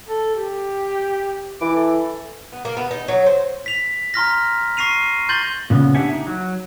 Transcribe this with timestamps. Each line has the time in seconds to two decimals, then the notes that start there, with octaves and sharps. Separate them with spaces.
0.09 A4
0.35 G4
1.61 E3 D6
1.76 A4
2.52 B3
2.65 A#3
2.77 B3
2.91 D#4
3.08 F#3
3.26 C5
3.66 B6 F7
4.14 A#5 C6 F6 A#6
4.77 C#6 A#6 C7 D#7 F7
5.29 C6 G6 A6 F#7 G7
5.70 A#2 C#3 B3
5.94 D4 G4 E5 F#5 G#5
6.13 D#4
6.27 F#3